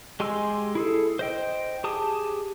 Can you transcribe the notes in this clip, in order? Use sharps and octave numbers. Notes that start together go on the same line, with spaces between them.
G#3 G4 G#5 C6 E6
E4 G#4 A4
C5 D#5 G5
G4 G#4 A5 D#6